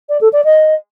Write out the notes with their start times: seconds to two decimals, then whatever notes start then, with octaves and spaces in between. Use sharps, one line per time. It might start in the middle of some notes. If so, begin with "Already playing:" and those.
0.09 D5
0.21 A4
0.32 D5
0.44 D#5